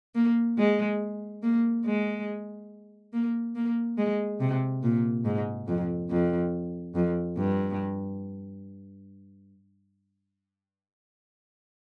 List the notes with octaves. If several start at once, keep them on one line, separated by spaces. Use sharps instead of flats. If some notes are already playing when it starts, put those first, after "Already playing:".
A#3
G#3
A#3
G#3
A#3
A#3
G#3
C3
A#2
G#2
F2
F2
F2
G2